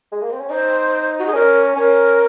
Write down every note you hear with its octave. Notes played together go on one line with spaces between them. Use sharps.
G#3
A#3
C4
C#4
D#4 C5
F#4
G#4
C#4 A#4
C#4 A#4